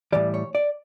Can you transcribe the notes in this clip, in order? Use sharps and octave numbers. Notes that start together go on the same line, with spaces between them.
A2 E3 G3 D5
C#5
D5